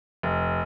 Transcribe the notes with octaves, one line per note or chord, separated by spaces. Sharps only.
F1